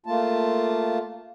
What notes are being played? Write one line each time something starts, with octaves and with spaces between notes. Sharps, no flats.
A3 A#3 F4 A5